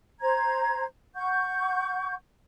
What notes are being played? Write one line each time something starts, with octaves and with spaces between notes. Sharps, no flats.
C5 A#5 G#6
F#5 C#6 G6